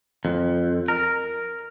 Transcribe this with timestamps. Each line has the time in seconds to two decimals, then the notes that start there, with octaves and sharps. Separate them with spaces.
0.25 F2
0.88 A#4